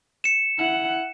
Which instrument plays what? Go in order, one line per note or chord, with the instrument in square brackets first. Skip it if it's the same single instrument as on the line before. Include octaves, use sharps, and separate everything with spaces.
[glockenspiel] C#7 E7
[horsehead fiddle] E4 F#5